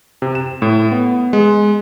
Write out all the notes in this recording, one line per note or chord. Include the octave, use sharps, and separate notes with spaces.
C3
E7
A2
B3
G#3